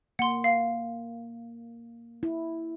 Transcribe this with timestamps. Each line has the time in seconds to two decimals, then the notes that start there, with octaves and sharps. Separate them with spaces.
0.19 A#3 F#5 C6
0.44 F5
2.23 E4